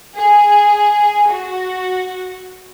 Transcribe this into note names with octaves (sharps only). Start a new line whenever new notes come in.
G#4
F#4